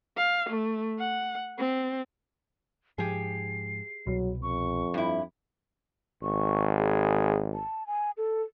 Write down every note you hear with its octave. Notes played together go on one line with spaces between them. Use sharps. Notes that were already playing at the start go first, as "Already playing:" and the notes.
F5
A3
F#5
C4
G#2 F3 G4 G#4 C7
C2 B2 F#3
F2 C#6
G2 E4
G#1 C#6
G#4
A5
G#5
A4